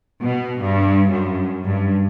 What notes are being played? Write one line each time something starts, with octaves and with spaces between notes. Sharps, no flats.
B2
G2
F#2
G2